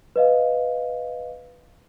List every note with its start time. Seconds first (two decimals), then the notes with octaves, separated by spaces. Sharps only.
0.16 B4 D#5 F5